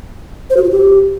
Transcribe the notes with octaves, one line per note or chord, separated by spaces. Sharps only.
C5
F#4
F4
G4